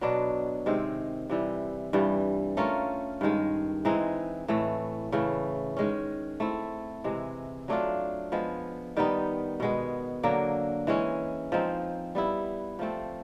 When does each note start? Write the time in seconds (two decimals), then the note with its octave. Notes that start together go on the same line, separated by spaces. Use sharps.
0.01 B2 F#3 B3 D4
0.66 C3 D#3 G#3 C4
1.30 C3 E3 G3
1.93 G2 E3 G3
2.57 A3 C#4 F4 A#4
3.21 G2 D#3 G#3
3.85 E3 G#3 C4 D#4
4.48 A2 E3 A3
5.12 C#3 E3 A3
5.77 D#3 G#3 C#4
6.40 A3 C4 E4
7.04 C3 E3 G#3
7.68 F#3 A3 D4 F4
8.32 F3 G#3 B3
8.96 D#3 G3 B3 D#4
9.60 B2 G#3 B3
10.23 D3 F#3 A#3
10.87 E3 G#3 C#4
11.52 F3 G#3 C4 D#4
12.15 G3 B3 E4
12.79 F3 A3 C4